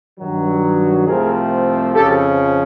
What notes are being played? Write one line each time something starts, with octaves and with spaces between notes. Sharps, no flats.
G2 D#3 F#3
C2 C3 F3 A3 C4 G#4 A#4
F2 C#3 F3 G4 A4